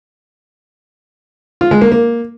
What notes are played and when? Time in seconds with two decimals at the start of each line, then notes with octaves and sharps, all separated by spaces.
1.61 F4
1.71 G#3
1.81 A#3
1.92 A#3